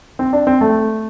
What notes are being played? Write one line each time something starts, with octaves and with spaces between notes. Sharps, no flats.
C4
D4
C4
A3